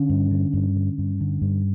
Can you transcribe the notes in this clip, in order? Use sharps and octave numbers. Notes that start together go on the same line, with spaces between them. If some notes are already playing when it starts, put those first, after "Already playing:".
Already playing: D3 C#4
G2
D3
G2
D3
G2
D3
G2